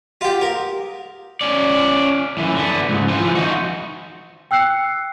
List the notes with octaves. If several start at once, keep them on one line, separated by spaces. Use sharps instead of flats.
F4 G4 D#5 F5 F#5
A#4 F5 D#6
C#4 D5
F#2 E3
D3 B3
C#2 G#2
E3 F3
D#4 F#4
G5 E6 F#6 C7 C#7